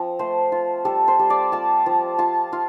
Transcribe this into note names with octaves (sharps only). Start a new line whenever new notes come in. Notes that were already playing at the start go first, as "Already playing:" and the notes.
Already playing: F3 C4
A3 C5
F4
G3 A4
C5
G3
D5
F4 A5
F3
F4 A5
F4